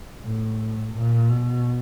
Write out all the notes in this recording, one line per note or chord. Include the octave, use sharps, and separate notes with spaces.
A2
A#2
B2